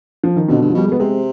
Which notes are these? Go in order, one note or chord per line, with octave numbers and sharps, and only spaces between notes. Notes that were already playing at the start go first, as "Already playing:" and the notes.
F3
D#3
F2 B2 D3
G2
F3
B2 G3
G#3
B2
B3
C3 G#3 C4